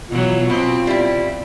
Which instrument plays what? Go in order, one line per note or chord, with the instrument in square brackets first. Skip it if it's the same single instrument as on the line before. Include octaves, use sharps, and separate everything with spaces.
[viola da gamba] B2 E3 F#3 [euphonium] F4
[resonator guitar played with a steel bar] B2 [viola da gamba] C4
[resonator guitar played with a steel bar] G3 E4